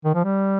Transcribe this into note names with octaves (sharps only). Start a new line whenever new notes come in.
D#3
F3
G3